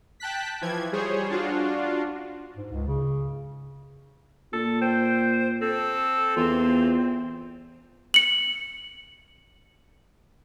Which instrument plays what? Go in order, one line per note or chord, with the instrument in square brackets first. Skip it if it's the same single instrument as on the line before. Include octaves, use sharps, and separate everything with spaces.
[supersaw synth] G5 A5 F#6 B6
E3 F3 G#6
G3 G#4 C5 C#5
D4 F4 F#4
[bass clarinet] G#2
C#2
C#3
[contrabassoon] A#2 [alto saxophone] A4
[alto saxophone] C5 [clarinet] G5
[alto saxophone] C4 [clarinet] A4
[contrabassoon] E2 [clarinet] F4
[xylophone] C#7 F#7